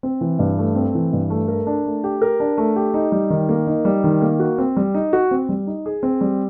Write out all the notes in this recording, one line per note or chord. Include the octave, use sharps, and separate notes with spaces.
C4
E3
G2
A3
C4
E3
G2
A3
A#4
D4
A3
G4
A#4
D4
A3
G4
D#4
G3
D#3
A#3
D#4
G3
D#3
A#3
F#4
C4
G3
D#4
F#4
C4
G3
D#4
G#4
C4
G3